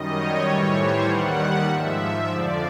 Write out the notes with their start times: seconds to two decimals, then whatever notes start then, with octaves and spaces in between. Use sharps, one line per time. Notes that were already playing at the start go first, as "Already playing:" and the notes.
Already playing: F#2 D#3 G3 D#5
0.15 C#5
0.44 A2 E3 G3
0.75 C5
1.05 D#2 D#3 G3 F#5
1.66 G#2 F3 E5
2.27 F2 D3 F3 D5